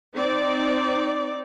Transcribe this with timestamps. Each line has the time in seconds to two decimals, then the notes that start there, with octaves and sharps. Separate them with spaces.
0.16 C4 D#4 D5